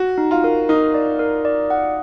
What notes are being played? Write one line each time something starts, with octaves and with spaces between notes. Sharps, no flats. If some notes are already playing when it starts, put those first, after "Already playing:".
Already playing: F#4
D#4
F4
A#4
D#4 A#4
D5
A#4
D5
F#5